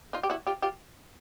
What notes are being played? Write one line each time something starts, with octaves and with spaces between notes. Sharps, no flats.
D#4 F4
G4
E4 F#4
F4 G4
F4 G4